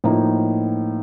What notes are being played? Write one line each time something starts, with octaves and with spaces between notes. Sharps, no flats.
A2 F3 A#3 D#4